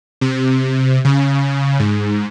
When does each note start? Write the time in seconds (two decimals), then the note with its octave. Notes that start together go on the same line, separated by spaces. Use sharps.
0.21 C3
1.05 C#3
1.79 G#2